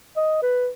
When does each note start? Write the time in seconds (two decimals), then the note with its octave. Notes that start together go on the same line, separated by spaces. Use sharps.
0.17 D#5
0.43 B4